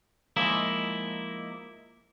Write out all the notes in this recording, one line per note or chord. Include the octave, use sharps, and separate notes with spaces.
F3 G#3 A#3 D#4 E4